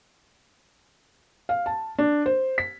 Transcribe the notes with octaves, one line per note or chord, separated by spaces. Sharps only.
F5
A5
D4
C5
B6